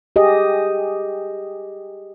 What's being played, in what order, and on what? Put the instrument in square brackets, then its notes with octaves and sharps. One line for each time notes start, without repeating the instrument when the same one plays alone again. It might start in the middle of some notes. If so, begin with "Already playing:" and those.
[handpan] G4 G#4 D#5